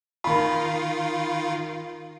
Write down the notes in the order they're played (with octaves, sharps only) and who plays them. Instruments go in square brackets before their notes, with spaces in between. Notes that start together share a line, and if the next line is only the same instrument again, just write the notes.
[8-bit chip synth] D#3 F4 [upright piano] A#4 B5